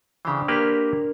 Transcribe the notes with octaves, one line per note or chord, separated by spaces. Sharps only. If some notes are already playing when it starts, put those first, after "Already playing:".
C#3 E3 D4 G4 C5
A#3 G4 A#4 B4 F6